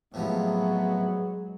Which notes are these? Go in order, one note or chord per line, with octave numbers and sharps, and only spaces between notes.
A2 C3 F3 F#3 G#3 B3